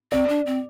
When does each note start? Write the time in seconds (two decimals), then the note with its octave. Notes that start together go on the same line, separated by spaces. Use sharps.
0.12 C4 D5
0.29 D4
0.46 C4